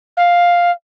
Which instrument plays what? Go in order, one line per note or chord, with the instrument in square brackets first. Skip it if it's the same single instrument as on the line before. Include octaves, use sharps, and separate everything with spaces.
[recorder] F5